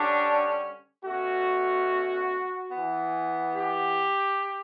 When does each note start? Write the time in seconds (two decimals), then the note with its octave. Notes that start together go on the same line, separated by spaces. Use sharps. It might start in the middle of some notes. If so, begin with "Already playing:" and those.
Already playing: D3 G3 C#4 D4
1.04 B2 A3 C#4 F#4
2.71 E3 B3
3.54 G4